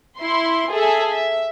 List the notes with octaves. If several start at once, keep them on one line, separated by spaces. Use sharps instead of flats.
E4 C6
G#4 A4 E5 G#5
E5